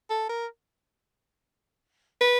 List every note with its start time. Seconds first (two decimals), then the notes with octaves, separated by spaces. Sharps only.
0.10 A4
0.29 A#4
2.21 B4